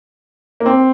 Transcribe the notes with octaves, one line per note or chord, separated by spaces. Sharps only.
A#3
C4